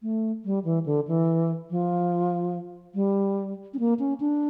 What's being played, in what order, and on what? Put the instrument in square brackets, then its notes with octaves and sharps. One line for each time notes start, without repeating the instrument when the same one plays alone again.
[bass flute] A3
G3
E3
D3
E3
F3
G3
C#4
A#3
C#4
D4